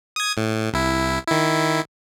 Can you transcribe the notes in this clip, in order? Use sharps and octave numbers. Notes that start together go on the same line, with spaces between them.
D#6 G#6
A2
C2 E4
D#3 E4